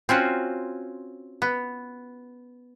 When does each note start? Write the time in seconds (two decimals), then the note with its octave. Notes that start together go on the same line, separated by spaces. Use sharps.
0.09 C4 C#4 F4 F#4
1.42 B3